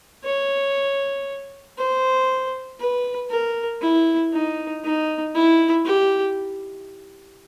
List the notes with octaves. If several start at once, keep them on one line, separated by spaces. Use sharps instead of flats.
C#5
C5
B4
A#4
E4
D#4
D#4
E4
G4